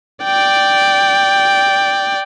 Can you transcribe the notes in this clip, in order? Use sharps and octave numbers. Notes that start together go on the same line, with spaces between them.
D5 G5